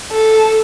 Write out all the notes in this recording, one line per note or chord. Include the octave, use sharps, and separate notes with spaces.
A4